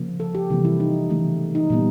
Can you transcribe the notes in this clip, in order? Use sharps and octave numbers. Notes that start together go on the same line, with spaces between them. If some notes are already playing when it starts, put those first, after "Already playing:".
Already playing: C#3 F3 A#3
A4
G4
C3 E3 G3 A#3
E4
D#4
C#3 E3 A3
D#4
A#2 G3 B3